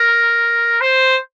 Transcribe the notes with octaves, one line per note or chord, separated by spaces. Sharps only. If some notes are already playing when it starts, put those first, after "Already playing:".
Already playing: A#4
C5